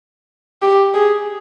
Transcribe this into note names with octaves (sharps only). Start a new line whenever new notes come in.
G4
G#4